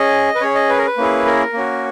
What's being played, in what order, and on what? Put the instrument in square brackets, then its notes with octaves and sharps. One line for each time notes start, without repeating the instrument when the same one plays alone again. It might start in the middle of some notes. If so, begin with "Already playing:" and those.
Already playing: [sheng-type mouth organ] C#4 G#4 D#5
B4
C#4 G#4 C#5
D#5
B4
A#4
B4
A#3 C#4 E4 G#4
A#4
A#3 C#4 F#4